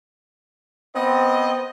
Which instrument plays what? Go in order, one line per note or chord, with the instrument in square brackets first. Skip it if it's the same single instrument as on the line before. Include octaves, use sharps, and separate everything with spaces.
[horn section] B3 C4 D#5